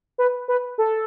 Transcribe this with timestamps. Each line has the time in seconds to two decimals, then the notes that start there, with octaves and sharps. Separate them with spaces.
0.18 B4
0.48 B4
0.78 A4